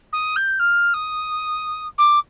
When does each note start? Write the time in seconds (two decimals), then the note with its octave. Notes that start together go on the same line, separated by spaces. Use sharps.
0.13 D#6
0.36 G6
0.59 F6
0.94 D#6
1.98 D6